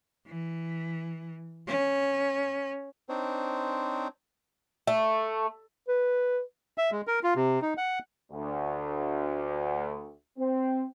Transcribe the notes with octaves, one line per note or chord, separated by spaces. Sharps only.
E3
C#4
C4 D4 D#4 C5 C#5
A3
B4
E5
G#3
A#4
F4
C3
D#4
F#5
D2
C4